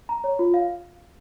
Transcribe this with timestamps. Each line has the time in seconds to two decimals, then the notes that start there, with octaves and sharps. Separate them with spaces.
0.09 A#5
0.24 C#5
0.39 F4
0.54 F5